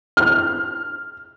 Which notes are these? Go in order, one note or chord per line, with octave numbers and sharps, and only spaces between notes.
F6